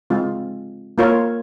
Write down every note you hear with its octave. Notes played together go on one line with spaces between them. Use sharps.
G#3 C4 F4
A#3 F4 A#4 C#5